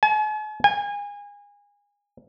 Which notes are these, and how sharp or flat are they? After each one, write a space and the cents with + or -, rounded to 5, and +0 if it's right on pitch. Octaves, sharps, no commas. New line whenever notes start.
G#5 +45
G#5 -30